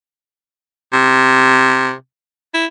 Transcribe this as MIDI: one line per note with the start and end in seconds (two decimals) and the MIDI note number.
0.93 1.93 48
2.54 2.66 64